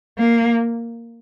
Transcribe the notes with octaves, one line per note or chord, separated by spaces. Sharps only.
A#3